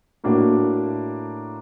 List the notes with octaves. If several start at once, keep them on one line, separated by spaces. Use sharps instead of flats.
A2 A#3 D4 F#4